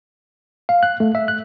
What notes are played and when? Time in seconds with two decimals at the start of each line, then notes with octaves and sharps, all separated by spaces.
0.69 F5
0.83 F#6
1.00 A3
1.15 E5
1.28 F#6